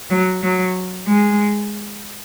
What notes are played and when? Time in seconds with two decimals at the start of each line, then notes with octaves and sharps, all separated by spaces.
0.10 F#3
0.42 F#3
1.07 G#3